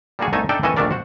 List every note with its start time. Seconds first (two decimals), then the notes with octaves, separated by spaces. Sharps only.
0.19 G3 A#3 D4 F#4 G#4 F#5
0.33 C2 A3 D#4 G#5 A5
0.49 D4 D#4 A4 D5 E5 G5
0.63 D#2 E3 C#4 A4 C#5 D#5
0.76 A#1 D#2 A3 D4 A#4 D5
0.91 F#4 C5 F#5